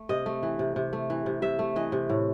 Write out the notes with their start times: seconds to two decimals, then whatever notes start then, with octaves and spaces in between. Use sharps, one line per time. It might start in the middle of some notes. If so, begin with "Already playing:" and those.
Already playing: A3
0.09 C3 D#5
0.26 A3
0.43 E3
0.59 C3
0.76 C3
0.93 A3
1.10 E3
1.26 C3
1.42 C3 E5
1.59 A3
1.76 E3 D#5
1.92 C3
2.09 A2